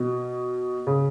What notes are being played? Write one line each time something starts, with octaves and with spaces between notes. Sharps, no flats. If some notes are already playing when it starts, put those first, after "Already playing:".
Already playing: B2
C#3